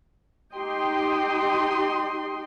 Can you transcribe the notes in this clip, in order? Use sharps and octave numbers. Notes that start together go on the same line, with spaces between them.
D#4 G4 D#5 G5 C6